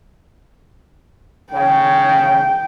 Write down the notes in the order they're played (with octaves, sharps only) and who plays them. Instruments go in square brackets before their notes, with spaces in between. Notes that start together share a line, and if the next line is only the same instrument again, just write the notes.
[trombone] C#3 [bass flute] C#5 [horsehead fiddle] G5